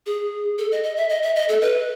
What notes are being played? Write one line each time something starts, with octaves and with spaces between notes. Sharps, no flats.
G#4
A4
D#5
D#5
E5
D#5
E5
D#5
A4
B4